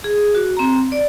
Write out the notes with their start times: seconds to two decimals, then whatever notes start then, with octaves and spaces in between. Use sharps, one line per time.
0.04 G#4
0.35 F#4
0.57 C4 A#5
0.92 D5